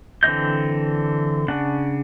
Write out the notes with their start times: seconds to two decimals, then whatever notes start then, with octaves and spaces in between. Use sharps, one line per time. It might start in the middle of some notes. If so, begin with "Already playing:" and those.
0.23 D3 E3 C4 D#5 G6
1.48 C#3 D4 F#5